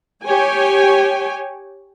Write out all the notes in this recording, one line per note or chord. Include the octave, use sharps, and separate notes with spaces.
G4 C#5 G5 G#5